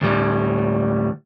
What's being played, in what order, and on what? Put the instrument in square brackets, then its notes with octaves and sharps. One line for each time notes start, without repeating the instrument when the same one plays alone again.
[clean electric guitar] D2 A2 G3